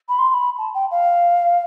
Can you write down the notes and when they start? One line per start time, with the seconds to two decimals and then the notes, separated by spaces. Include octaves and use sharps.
0.09 B5
0.19 C6
0.29 C6
0.34 B5
0.58 A5
0.74 G5
0.91 F5